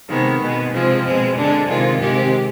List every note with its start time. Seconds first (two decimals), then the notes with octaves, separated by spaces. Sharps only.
0.09 C3 D#3 G#3 B3
0.40 B2 G#3
0.73 C3 F3 G#3 C4
1.05 B2 G#3
1.36 D3 G#3 D4
1.68 C3 D#3 G#3 F4
2.00 C3 D#3 G#3 G4